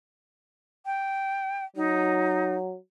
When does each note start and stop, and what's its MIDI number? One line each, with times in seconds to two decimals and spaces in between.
0.86 1.65 79
1.76 2.77 54
1.76 2.55 63